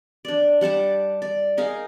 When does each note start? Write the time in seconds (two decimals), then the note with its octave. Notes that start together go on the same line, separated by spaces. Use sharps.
0.25 D4 D5
0.61 G3 F#5 A5 D6
1.22 D5
1.57 D#4 G#4 A#4 F5